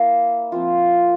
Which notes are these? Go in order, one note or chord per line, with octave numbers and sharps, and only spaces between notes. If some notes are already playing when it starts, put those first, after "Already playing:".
Already playing: A#3 E4
F3 C4 F4